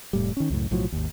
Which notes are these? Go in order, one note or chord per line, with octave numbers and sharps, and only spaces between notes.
F1 A2 G3
D#3 C#4
C#2 F#2 A2
B1 A2 F3 F#3
G#1 D#2